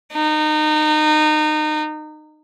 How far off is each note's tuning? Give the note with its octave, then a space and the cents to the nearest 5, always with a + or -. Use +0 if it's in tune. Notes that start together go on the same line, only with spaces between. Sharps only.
D#4 -25